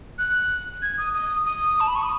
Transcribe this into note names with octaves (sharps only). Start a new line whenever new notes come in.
F#6
G#6
D#6
D#6
D#6
A5
B5
C#6
D#6